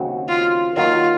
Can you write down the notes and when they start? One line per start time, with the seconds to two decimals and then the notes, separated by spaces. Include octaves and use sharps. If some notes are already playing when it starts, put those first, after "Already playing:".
Already playing: D#2 C#3 F#3 C4 F#4
0.29 F4
0.76 D#2 D#3 F#3 F4